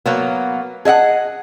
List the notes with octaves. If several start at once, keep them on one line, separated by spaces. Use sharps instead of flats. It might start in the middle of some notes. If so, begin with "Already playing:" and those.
F#3 A#3 B3
G#4 D#5 E5 F#5